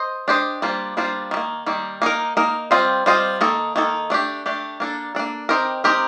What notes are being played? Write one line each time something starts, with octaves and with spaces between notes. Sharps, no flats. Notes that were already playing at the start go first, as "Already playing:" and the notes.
Already playing: C5 D#5
D4 G4 C5 D#5
G3 A#3 D4 F4 C5
G3 A#3 D4 F4 C5
D#3 G3
A#3
D#3 G3 A#3
A#3 D#4 A#4
A#3 D#4 A#4
G3 C4 F4 C5 D#5
G3 C4 F4 C5 D#5
D#3 A#3 D#4 A4
D#3 A#3 D#4 A4
A3 D4 G4
A3 D4 G4
A#3 D4 A4
A#3 D4 A4
C4 D#4 G4 A#4
C4 D#4 G4 A#4